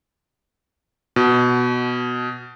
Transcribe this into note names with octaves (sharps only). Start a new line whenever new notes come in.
B2